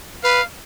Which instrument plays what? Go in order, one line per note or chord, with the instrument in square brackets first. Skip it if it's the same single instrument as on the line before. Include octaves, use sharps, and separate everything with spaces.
[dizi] B4 [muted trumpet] F5